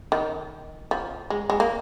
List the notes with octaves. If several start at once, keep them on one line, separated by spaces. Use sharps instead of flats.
D#3
F3
G#3
G#3
A#3